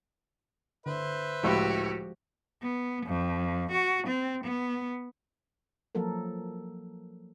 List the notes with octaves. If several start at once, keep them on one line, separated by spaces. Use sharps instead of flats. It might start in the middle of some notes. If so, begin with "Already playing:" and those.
D3 B4 C5 E5
C#2 A2 F3 G#3 E4 F#4 G4
B3
F2
F#4
C4
B3
F3 F#3 A#3 A4 A#4